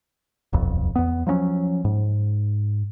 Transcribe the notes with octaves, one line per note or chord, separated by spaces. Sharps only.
D#1 B1 F2
E2 B3
F3 F#3 B3 C#4
G#2